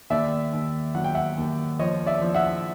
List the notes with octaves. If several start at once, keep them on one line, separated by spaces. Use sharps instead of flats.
D#2 D5 E5
D#2
F#3 F#5
G5
E5 F#5
D#2
F3 C#5 D#5
D5 E5
F3
E5 F#5